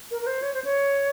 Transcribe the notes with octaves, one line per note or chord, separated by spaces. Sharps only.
A#4
A#4
C5
C#5
C5
C#5